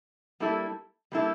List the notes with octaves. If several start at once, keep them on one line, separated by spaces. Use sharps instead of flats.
G3 A#3 E4 A4
G3 A#3 E4 A4